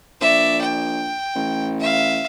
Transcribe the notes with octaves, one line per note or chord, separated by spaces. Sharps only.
A#1 D5 E5
G5
A1
E5 F5